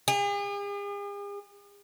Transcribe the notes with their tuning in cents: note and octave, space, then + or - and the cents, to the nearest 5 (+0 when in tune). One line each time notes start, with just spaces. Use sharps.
G#4 -45